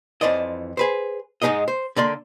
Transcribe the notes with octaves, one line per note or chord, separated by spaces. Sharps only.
F2 B2 E3 C5 D5 D#5
G#4 B4 C5
G#2 G#3 D4 D#4 G#4 D#5
C5
D3 A#3 D5 C6